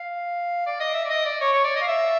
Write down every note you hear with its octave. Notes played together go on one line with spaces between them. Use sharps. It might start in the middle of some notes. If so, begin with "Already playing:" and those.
Already playing: F5
D5
D#5
E5
D5
D#5
D5
C#5
C#5
D5
D#5
F5
E5